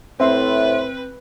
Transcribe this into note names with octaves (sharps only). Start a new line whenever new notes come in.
A2 C4 B4 C5 E5 C6